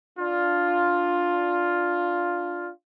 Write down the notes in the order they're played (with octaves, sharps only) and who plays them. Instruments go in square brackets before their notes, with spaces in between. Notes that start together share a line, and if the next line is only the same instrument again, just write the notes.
[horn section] D4 F4